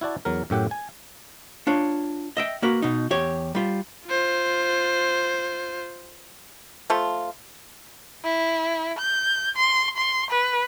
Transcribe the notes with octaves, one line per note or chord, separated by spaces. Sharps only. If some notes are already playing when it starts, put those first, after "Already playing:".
E4 F#4 D5 A5
E2 F#3 A#4
F#2 A2 G4 F#5
G#5
D4 F4 C#5
D#5 E5 G5
A#3 F#4 A#4 B4
B2 D#4
E2 G4 C#5
G3 F4
F4 C5
F3 A3 F4
E4
G6
C6
C6
B4